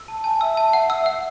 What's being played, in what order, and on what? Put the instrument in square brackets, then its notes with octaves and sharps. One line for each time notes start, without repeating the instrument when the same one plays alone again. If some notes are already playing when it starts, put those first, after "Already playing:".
Already playing: [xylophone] E6
A5
[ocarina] G#5 [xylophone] A5
[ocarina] E5 [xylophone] E6
[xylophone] A5
F#5
E6
F#5